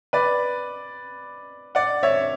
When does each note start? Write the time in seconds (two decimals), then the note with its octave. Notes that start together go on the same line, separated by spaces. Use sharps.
0.13 B4 D5
1.75 D5 F#5
2.03 C#5 E5